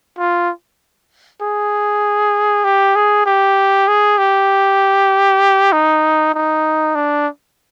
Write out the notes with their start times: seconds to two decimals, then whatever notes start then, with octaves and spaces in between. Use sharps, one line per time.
0.19 F4
1.41 G#4
2.64 G4
2.96 G#4
3.26 G4
3.88 G#4
4.18 G4
5.72 D#4
6.34 D#4
6.95 D4